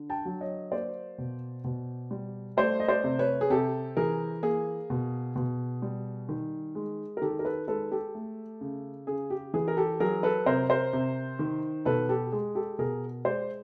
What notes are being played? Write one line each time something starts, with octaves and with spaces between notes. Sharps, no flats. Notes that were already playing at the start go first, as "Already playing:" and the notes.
Already playing: D3
G5 A5
F#3
C#5 D#5
A#3 C5 D5
B2
B2
G3
A3 C5 D5
D#5
C5 D5
C3
B4 C#5
G#4
C3 G4 A4
E3 G#4 A#4
A#3 G#4
B2
B2
G3
D#3
G#3
A#4
D#3 G4 A4
A#4
A4 B4
G#3 A4 B4
G4 A4
A3
C#3
C#3 G#4
G4
E3 G#4
A#4
G4 A4
F#3 G#4 A#4
A4 B4
C3 A#4 C5
A#4 C5
C3
D#3
B2 A4 B4
G4 A4
G#3 G#4
G4 A4
B2 G#4 A#4
G#3 C5 D5